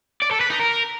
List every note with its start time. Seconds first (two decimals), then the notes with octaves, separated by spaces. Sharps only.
0.22 D5
0.31 A4
0.41 B4
0.50 D#4
0.60 A#4